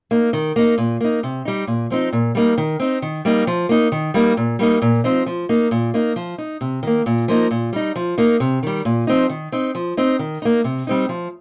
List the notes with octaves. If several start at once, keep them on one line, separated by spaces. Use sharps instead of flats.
A#3 D#4
D#3
A#3 D#4
A#2
A#3 D#4
C3
G3 D#4
A#2
F3 C4 D#4
A#2
G3 A#3 D#4
D#3
C4 D#4
D#3
G3 A#3 D#4
F3
A#3 D#4
D#3
G3 A#3 D#4
A#2
G3 A#3 D#4
A#2
F3 C4 D#4
F3
A#3 D#4
A#2
A#3 D#4
F3
D#4
C3
D#3 A#3
A#2
F3 A#3 D#4
A#2
G3 D#4
F3
A#3 D#4
C3
D#3 G3
A#2
F3 C4 D#4
D#3
C4 D#4
F3
C4 D#4
D#3
A#3 D#4
C3
G3 C4 D#4
F3